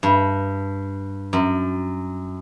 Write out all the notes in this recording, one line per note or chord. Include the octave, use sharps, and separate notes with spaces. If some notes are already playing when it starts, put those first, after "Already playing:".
G2
F#2